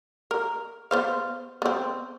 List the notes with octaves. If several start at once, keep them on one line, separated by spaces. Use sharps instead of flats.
A#4
B3 C5 F5
B3 C4